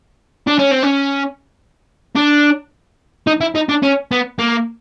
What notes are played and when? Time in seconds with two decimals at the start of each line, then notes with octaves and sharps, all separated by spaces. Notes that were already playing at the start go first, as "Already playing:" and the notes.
0.47 D4
0.59 C#4
0.72 C4
0.84 C#4
2.15 D4
3.27 D#4
3.41 E4
3.55 D#4
3.69 D4
3.83 C#4
4.11 B3
4.39 A#3